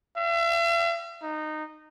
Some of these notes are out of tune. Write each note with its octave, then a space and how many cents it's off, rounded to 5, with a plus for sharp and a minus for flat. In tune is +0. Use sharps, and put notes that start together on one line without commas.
E5 +45
D#4 -15